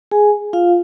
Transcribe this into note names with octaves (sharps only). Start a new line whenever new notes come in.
G#4 G#5
F4 F5